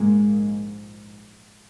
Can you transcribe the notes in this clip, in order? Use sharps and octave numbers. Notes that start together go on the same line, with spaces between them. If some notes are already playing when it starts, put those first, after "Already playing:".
Already playing: A#1 G#2 G#3 A#3